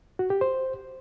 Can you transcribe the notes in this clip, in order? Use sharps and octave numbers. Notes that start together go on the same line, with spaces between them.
F#4
G4
C5